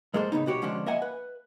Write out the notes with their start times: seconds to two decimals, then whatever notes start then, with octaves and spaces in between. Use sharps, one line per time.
0.14 G#2 G#3 A#3 G#4 A4 C5
0.32 A2 C#3 B3 D#4
0.46 C2 B2 F#4 G4 C#5
0.62 D3 F3 G#3 C#4 D4
0.86 A#3 D#5 E5 F#5 G#5
1.02 B4